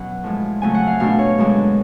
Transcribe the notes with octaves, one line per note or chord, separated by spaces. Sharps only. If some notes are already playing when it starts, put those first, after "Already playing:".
Already playing: B2 F#3 C#4 F#5
A2 F3 G#3
F2 C#3 F#3 A3 C#4 G#5
F#5
F5
B2 A3 D4 F5
C#5
F#2 D3 G#3 D4